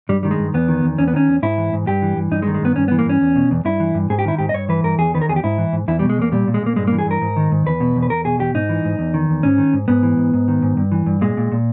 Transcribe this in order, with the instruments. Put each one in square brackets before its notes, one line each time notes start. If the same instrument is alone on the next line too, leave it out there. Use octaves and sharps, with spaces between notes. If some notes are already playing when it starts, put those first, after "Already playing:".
[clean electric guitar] G2 G3
D#3 G3
G#3
G2
E2 B3
D#3
E2
E2 C#4
B3
D#3 C#4
E2
G#2 E4
E3
G#2
G2 G4
E3
G2
G2 D#4
G#3
D#3
G#3
G2 B3
G2 C#4
B3
E3
A#3
G2 C#4
E2
B2
E2
G2 E4
E3
G2
G#2 G#4
G4
D#3 E4
G#2 G4
D#5
G2 C#5
E3 B4
G2 A#4
E2 G#4
D#3 B4
A#4
E2 G#4
G4
G#2 E4
E3
G#2
E2 E4
G3
B2
G#3
E2 A#3
A#2 G3
A#2
G#3
A#2 A#3
G2 G#3
A#3
E3
G#4
G2 A#4
G#2
D#3
G#2
E2 B4
B2
E2
B4
E2 A#4
B2 G#4
E2 G4
G#2 D#4
E3
G#2
E2
D#3
E2
G#2 C#4
D#3
G#2
G#2 B3
E3
G#2
G#2
D#3
G#2
G2
E3
G2
A#2 G#3
A#2
A#2